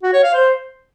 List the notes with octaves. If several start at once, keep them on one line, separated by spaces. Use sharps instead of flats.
F#4
C#5
F5
C5